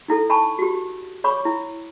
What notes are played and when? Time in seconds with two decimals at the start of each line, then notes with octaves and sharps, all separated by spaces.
0.08 D#4 E4 A4
0.30 G#5 A5 B5 C#6
0.59 F#4 G4
1.24 C#5 B5 C#6 D6
1.45 E4